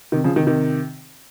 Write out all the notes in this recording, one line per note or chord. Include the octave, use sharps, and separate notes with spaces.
C3 D#3
C#3 F3
C3 D#3
C3 D#3